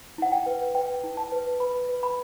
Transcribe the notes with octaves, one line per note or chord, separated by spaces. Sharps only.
E4 F#5
G5
B4
B4 G5
E4
A5
B4
B4 B5
B4
B5